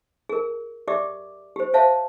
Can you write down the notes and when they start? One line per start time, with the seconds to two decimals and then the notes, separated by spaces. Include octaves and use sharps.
0.29 G#4 A#4
0.88 G4 D5 E5 D6
1.56 G4 C5
1.74 C5 C#5 E5 F5 A5